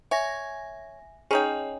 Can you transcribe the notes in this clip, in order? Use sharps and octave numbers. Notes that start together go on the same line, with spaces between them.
C#5 E5 G#5 A#6
C#4 D#4 G#4 C#5 G5